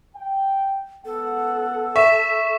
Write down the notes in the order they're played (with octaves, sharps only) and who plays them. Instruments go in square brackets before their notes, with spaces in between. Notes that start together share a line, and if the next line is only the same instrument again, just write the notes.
[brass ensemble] G5
[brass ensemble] C#2 B3 F#5 [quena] A4
[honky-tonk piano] E5 [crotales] C#6 B6 E7